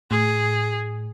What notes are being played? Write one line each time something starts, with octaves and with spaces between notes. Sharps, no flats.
A2 G#4